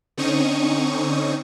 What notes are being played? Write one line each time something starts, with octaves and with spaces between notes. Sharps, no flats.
D3 C4 C#4 D#4 C#6 D#6